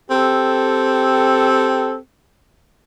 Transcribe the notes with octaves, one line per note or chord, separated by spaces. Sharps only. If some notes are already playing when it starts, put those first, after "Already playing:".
C4 G4 A4